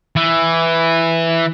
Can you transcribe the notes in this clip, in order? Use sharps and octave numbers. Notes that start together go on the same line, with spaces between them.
E3